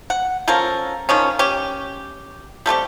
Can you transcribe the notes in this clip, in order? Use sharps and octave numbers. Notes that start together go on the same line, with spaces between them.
F#5
F3 C#4 A4 A#4
D#3 F3 C#4
C#4 G4
G3 A3 C4 G4